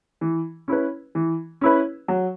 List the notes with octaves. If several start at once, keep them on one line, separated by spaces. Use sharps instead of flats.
E3
C#4 E4 B4
E3
C#4 E4 B4
F#3